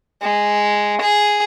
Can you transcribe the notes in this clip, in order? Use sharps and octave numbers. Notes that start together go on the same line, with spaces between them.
G#3
G#4